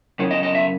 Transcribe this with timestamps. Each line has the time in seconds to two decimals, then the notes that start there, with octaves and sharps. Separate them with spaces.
0.19 F#2 C#3
0.31 D#5
0.43 D#5
0.55 E5